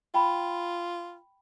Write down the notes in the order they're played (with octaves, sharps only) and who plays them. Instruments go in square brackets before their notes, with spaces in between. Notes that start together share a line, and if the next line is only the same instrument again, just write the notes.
[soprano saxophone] F4 [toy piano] G5 B5